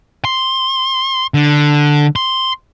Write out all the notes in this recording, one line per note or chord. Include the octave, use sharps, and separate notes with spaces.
C6
D3
C6